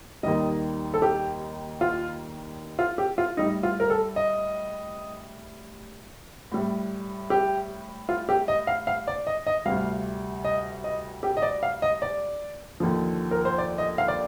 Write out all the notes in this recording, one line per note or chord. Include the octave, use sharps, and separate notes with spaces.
D#2 D#3 G3 D#5
A4
G4
F4
F4
G4
F4
A2 G3 D#4
F4
A#4
A4
D#5
A2 G3
G4
F4
G4
D#5
F5
F5
D5
D#5
D#5
D2 C3 G3 F5
D#5
D#5
G4
D#5
D5
F5
D#5
D5
D#2 D3 F3
A#4
C5
D5
D#5
F5
D5